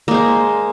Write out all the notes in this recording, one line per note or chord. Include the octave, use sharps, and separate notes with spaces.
G#3 A#3 C5